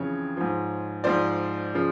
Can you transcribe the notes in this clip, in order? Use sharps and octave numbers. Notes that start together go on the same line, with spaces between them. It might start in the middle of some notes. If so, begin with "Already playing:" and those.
Already playing: F2 C#3 E3 C#5
G#2 F3
G#2 F3 C5 D5
C#3 F3